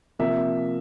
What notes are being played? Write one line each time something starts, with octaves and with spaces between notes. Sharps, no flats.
C3 F3 A#3 E5